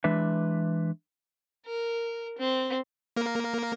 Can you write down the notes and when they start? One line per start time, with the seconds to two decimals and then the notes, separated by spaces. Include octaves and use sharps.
0.04 E3 G#3 D4 B4 E5
1.66 A#4
2.38 C4
3.16 A#3 A#4